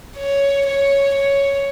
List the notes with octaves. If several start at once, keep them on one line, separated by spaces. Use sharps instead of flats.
C#5
C#5
C#5